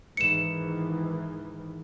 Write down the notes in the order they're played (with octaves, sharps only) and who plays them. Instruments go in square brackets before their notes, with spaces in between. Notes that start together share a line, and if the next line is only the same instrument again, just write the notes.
[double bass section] G#2 D#3 E3 [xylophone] C#7 E7